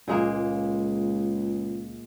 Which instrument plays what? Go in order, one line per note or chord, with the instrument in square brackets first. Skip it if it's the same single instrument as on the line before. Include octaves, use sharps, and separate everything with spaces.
[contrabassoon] C#2 [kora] A#2 G#3 A#3